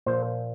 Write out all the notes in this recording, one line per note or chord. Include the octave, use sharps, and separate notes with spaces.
A#2 F3 C5